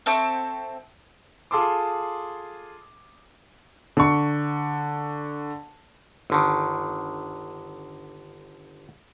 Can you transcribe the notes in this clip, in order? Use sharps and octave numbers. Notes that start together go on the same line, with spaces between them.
C4 A4 E5 C#6
F4 G#4 A4 A5 C6 D6
D3 C#6
G1 D3 D#3